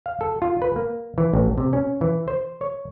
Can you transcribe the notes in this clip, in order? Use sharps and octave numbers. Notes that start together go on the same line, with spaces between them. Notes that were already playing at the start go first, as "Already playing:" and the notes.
F5
A4
F4
B4
A#3
E3
A1
C3
C#4
E3
C5
C#5